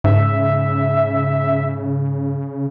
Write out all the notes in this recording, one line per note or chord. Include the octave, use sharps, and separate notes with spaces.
G#2 C#3 E5